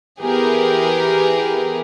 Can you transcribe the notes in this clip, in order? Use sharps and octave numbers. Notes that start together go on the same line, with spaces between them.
E3 B3 G4 G#4 A#4 B4